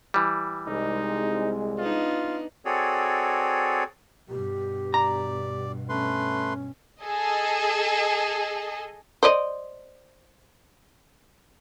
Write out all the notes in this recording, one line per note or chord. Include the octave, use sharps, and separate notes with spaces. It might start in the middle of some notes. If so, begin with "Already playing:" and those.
E3 G3
C2 G#3 D#4
B3 D4 D#4 F4
C4 F#4 G#4 A4 C#5 D5
G2 B2 G4
D5 A#5
A3 C#4 B4 C6
G#4 A4 D#5
C5 D5 D#5